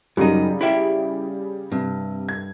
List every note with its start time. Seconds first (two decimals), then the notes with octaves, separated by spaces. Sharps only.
0.17 F#2 C#3 G3 D#4
0.61 E4 G4 E5
1.72 G2 C3
2.29 G#6